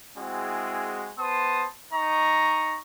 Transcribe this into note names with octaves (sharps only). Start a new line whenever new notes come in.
G#3 C4 E4 F#4 G#4
B3 C5 A5 C6 D#6
D#4 D#5 A#5 C#6